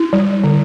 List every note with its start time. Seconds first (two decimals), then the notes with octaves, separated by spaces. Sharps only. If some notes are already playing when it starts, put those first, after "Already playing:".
Already playing: E4
0.13 G3
0.44 D3